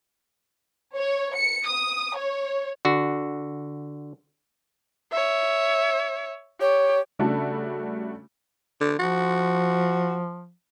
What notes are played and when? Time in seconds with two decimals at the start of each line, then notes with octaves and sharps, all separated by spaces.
0.96 C#5
1.36 C#7
1.68 D#6
2.17 C#5
2.85 D3 F#4
5.12 C#5 E5
6.61 G4 C#5
7.19 C#3 G3 A3 D4 F#4 A4
8.80 D3
8.99 F3 F#4